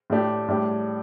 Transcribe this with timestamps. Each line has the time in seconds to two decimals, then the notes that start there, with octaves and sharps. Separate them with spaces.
0.10 A2 A3 D4 G4
0.48 A2 G3 D4 G4